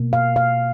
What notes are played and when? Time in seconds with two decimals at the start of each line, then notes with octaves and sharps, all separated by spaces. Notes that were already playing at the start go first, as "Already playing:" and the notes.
Already playing: B2 A#3
0.13 F5
0.36 F5